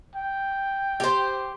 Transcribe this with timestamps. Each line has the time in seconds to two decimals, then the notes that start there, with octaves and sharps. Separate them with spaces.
0.16 G5
1.00 G4 C5